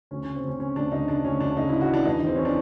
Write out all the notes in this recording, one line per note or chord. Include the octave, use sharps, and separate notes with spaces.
D2 C#4
C#3 C#4
C4
D2 C#4
C#3 C#4
D2 D4
D2 D#4
C#3 D4
D2 C#4
D2 D4
C#3 D#4
C#3 E4
F#4
E3 D4
E2 D#4
E2 C4
E3 C#4
D4